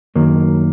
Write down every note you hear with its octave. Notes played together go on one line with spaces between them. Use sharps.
F#2 D#3 F#3 A#3